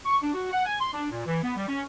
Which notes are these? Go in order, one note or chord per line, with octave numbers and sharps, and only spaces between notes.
C#6
D4
F#4
F#5
G#5
C6
D4
A#2
E3
B3
G3
C#4